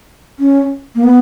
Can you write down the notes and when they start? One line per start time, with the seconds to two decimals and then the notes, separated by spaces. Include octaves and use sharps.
0.39 C#4
0.95 A#3
1.04 B3